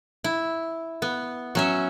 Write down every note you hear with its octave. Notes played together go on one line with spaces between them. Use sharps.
E4
B3
F#3 C#4 E5